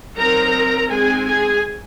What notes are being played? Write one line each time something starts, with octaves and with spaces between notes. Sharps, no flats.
F#3 C4 D#4 A#4 A#5
G#3 C4 D#4 G#4 G#5
G#4 G#5